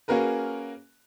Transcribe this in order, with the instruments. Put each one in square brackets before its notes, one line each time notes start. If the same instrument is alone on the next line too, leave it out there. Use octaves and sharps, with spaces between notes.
[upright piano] A#3 C#4 F#4 G#4 A#4 B4